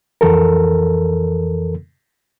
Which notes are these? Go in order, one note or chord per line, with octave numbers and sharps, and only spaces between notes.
F2 E3 A4 A#4